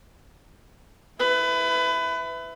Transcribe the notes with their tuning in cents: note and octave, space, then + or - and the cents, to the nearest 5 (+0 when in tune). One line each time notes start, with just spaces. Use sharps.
E4 +0 B4 +25